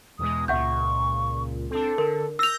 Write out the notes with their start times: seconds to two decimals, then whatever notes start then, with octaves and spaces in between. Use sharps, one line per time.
0.19 E2 B2 G#3 D#6
0.48 C#2 A#2 E5 F#5 C#6 G6
1.71 C4 D4 A4
1.98 D3 A#4
2.39 E6 G6 A#6 F7